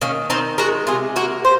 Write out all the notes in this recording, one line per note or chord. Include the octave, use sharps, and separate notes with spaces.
D#3 A#3 C#4
D#3 C4 D#4
G#3 F#4 A#4
C3 F4 G#4
A#3 F#4 A#4
C5